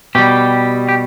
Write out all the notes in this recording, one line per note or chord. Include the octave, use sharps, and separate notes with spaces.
B2 G3 G4
G4